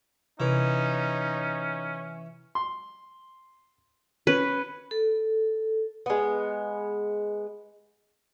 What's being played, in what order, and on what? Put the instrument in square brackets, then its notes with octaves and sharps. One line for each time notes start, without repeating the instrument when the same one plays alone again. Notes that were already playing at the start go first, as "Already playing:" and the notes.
[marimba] C3 [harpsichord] E3 [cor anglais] C#4 [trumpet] D#4
[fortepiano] C6
[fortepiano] C#4 [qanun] B4
[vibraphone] A4
[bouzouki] G#3 B3